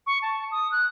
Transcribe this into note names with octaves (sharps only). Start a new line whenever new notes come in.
C#6
A5
D#6
F#6